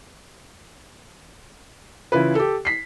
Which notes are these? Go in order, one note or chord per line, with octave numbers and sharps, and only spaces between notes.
C#3 E3 E4 F4 B4
G4 A4
B6 C7